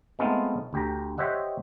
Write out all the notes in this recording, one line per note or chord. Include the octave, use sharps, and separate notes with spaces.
G#3 A3 B3 C4 D#4 F4
D2 G4 A#5
G4 C5 C#5 D#5 E5 F#5